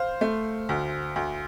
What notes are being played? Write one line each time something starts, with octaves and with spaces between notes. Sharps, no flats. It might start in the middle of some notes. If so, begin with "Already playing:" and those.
Already playing: C5 F5
A3
D2
D2